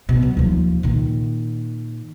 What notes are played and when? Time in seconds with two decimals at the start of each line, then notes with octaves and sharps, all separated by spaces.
0.09 B2
0.23 F#3
0.37 D#2 F3
0.83 A#2 D#3